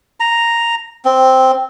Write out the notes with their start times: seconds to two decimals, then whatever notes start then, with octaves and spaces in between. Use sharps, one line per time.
0.20 A#5
1.05 C4